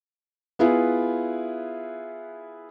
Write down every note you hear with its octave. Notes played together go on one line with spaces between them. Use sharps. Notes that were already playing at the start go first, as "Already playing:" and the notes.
B3 E4 F4 G#4 B4